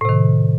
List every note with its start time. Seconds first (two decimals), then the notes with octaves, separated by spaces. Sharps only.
0.01 A2
0.05 C3
0.09 D#3